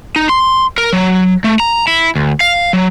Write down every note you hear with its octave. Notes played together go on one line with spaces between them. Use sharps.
D#4
C6
A#4
F#3
A3
A#5
E4
D2
F5
F#3